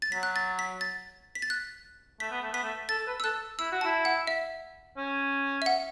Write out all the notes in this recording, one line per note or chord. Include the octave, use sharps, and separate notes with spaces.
A6
F#3 B6
F#6
A6
B6
A6
B6
A6
F#6
A3 B6
B3
A3
B3 B6
A3
A4 A6
A4
B4
E6
A4 F#6
E4 E6
F#4
E4 A5
F#5
E5
C#4
E5
F#5